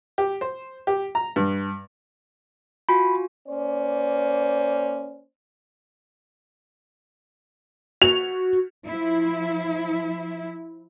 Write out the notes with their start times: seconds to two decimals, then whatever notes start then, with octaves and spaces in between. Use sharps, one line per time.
0.18 G4
0.41 C5
0.87 G4
1.15 A#5
1.36 G2
2.89 F4 F#4 G#5 B5
3.47 A#3 C#4 C5 D5
8.02 F#4 F7
8.86 F3 E4